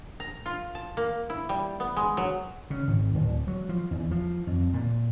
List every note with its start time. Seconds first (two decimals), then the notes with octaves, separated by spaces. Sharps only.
0.20 A#5
0.46 F4
0.75 A5
0.97 A#3
1.30 E4
1.49 G3
1.80 B3
1.97 G#3
2.17 F#3
2.70 C#3
2.88 G#1
3.14 D1
3.48 F#3
3.69 F3
3.91 E2
4.11 F3
4.47 F2
4.74 A#2